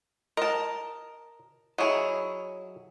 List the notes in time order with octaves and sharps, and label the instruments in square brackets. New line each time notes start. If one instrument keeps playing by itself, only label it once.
[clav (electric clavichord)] A#4 [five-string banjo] D#5 A5
[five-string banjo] F#3 E4 [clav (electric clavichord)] G#4 C#5 D#5